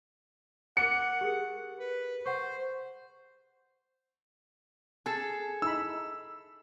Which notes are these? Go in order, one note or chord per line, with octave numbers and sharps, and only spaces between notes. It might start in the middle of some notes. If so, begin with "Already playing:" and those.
A#4 F#5 D6 F#6 C#7
G4 G#4 A#4
B4
C5 F#5 C#6
G#4 A4 A5
D#4 E4 B5 E6